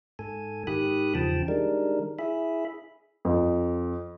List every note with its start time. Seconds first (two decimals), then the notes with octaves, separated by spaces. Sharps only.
0.19 G#2 A4 G#5
0.67 G#2 D#3 G4 B5 D#6 F#6
1.15 E2 C#3 F3 G5 A5
1.48 D#3 G3 G#3 D4 A#4
2.19 E4 G#4 E5 B5
3.25 F2